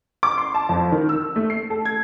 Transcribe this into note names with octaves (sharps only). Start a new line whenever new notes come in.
D6
C6
A5
F2
D#3
E6
A3
C7
A4
G#6